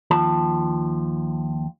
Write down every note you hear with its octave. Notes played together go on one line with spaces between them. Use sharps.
D#2 F3 A5